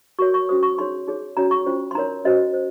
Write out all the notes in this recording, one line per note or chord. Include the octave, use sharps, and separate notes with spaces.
F#4 A#4 C#5 C#6
C#6
C#4 F#4 C5 D#6
C#6
D#4 G#4 C#5 C6
D#4 G#4 C#5
C#4 F#4 C#5 A#5
C#6
C#4 F4 C5
C6
D#4 A#4 C#5 A#5
C#4 F#4 C5 D#5
C5